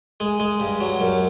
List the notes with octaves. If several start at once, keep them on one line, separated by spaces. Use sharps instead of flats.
G#3
G#3
G2
F#3
F#2